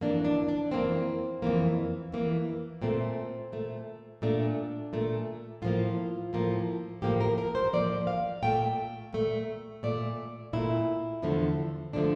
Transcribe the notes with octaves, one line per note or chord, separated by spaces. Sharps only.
F2 E3 A#3 D4
D4
D4
F2 E3 A#3 C4
F2 E3 A#3
F2 E3 A#3
A#2 A3 C4
A#2 A3
A#2 A3 D4
A#2 A3
A2 F3 A#3 F4
A2 F3 A#3
A2 F3 A#3 G4
A#4
A#4
C5
A2 F3 A#3 D5
F5
A#2 A3 G5
A#2 A3
A#2 A3 D5
A#2 A3 E4
E2 D3 F3 A3
D3 F3 A3 D4